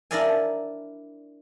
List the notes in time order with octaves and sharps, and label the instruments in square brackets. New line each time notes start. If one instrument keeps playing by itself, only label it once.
[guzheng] D4 E4 A#4 D5 F5 G#5